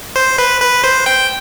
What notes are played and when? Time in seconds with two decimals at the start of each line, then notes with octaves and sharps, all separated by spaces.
0.16 C5
0.38 B4
0.61 B4
0.84 C5
1.06 G5